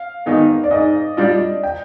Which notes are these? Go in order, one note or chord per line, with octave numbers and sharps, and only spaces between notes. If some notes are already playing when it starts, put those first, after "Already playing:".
Already playing: F5
G#2 D#3 B3 D#4
D5
G#2 D#5
G3 D4 F4
G5